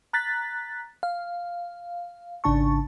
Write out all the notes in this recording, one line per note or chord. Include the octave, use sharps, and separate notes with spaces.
A#5 F#6 A6 B6
F5
G#1 C#3 D4 A5 C#6